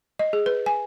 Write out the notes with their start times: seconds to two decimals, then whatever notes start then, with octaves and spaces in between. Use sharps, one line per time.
0.19 D#5
0.33 G#4
0.46 B4
0.66 G#5